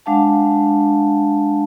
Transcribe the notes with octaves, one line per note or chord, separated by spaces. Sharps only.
G#3 D4 F5 F#5 A5